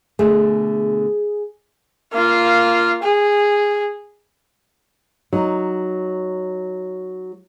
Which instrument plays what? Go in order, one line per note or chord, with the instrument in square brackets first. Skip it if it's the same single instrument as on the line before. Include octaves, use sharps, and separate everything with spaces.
[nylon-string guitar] B2 D3 A3 [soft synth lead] G#4
[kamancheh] A#3 F4
G#4
[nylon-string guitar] F#3 D#4